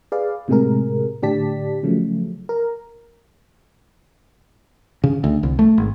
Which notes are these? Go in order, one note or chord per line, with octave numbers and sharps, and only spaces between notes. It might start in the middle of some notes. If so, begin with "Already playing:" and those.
G#4 B4 D5 F5
A2 C3 G#3 G#4 A#4
A2 D3 G4 D5 A5 B6
C#3 F3 F#3 A3
A#4
C#3
D2
C2
A3
G#1